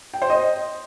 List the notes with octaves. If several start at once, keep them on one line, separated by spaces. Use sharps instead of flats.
G5
C5
D#5